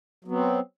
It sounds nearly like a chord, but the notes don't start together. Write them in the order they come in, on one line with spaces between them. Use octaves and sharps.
F#3 B3 C4